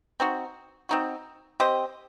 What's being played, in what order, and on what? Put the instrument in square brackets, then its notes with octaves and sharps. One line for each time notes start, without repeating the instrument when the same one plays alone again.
[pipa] C4 D#4 F#4
C4 D#4 F#4
C4 G4 C5 D#5